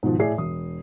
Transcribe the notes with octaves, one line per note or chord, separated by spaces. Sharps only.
G#2 B2 D#3 F3
A2 G#4 D5 E5 C7
E1 D#6